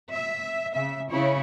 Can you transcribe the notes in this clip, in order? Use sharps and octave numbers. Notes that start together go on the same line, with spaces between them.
E5
C#3 E5
C#3 E4 C#5